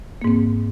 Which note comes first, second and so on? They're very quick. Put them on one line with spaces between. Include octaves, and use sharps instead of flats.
A#3 G#2 C4